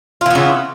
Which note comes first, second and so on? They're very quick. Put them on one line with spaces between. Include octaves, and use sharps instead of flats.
F4 E3 B3 C#3